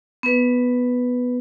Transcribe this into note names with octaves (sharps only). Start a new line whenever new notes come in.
B3 B4